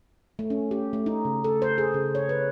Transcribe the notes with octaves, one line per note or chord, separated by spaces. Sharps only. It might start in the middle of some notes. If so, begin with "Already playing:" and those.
A3
C#4
G4
A3
D#4
C#3
A4
C5
G#4
C#3
C#5
B4